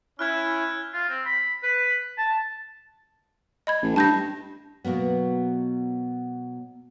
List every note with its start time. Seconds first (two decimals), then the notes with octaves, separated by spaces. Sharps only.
0.19 C#4 E4 F6 F#6 G#6
0.93 F4
1.09 C4
1.26 B5
1.63 B4
2.18 A5
3.67 D#5 B5 G#6
3.82 A1
3.96 G2 A5 G6 A#6
4.84 B2 F#3 A#3 B3